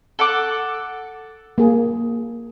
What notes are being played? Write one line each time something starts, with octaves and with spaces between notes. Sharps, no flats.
A4 F#5 D6
A#3 G#4